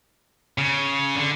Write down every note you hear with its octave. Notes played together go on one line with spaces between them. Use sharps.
C#3
D3